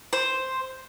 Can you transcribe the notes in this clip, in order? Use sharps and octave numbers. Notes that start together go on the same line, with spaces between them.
C5